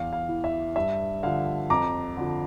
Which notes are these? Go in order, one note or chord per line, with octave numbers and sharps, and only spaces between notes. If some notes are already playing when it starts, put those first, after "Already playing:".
Already playing: E2 F5
F5
E3
E5
G2 E5
D3 F3 F5
F2 A#5 D6
D3 F3